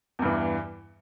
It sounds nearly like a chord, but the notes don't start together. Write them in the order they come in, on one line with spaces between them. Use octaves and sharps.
E2 G2 E3